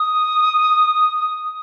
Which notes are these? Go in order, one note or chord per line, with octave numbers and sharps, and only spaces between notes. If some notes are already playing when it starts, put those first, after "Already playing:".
Already playing: D#6